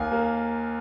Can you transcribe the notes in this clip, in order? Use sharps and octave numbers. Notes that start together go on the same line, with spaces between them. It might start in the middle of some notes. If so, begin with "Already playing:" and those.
Already playing: D#2 F5 G#5
A#3